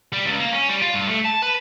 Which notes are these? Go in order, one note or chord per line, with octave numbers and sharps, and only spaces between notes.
G3
C#2
A#3
C#4
G3
F4
G2
A3
A5
B4